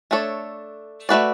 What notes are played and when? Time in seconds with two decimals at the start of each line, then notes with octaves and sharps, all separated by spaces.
0.11 A3 D4 A4 C#5
1.09 A3 D4 F#4 B4 D5